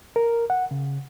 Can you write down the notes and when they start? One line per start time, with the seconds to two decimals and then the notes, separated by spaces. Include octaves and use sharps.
0.16 A#4
0.50 F#5
0.71 C#3